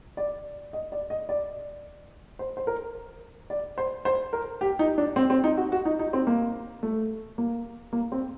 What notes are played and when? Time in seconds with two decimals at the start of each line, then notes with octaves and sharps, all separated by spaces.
0.17 D5
0.73 D#5
0.92 D5
1.10 D#5
1.29 D5
2.39 C5
2.57 C5
2.67 A#4
3.50 D5
3.78 C5
4.05 C5
4.33 A#4
4.61 G4
4.79 D#4
4.98 D4
5.16 C4
5.30 C4
5.44 D#4
5.57 F#4
5.72 F#4
5.85 D#4
5.99 D#4
6.13 C4
6.27 A#3
6.83 A3
7.38 A#3
7.93 A#3
8.12 C4